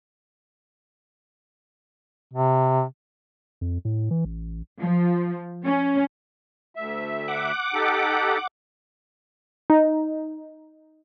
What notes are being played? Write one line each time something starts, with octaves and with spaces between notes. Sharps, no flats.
C3
F2
A2
E3
A1
F3
C#4
D2 E5
F#5 D6
D#4 G4 A4
D#4